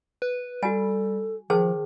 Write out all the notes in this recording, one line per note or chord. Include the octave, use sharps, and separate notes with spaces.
B4
G3 F#4 A4 G#5
D#3 F3 G#4 C5 A5